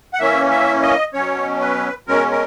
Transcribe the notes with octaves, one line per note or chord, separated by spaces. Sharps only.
F#5
E3 A#3 C#4 E5
E5
D#5
B2 F#3 C#4 C#5
B4
B2 G#3 C#4 A#4
A#4